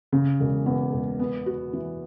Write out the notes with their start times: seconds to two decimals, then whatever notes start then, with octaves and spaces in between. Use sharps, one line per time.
0.12 C#3
0.40 E1
0.66 E2
0.93 E1
1.20 B3
1.46 F#4
1.73 E3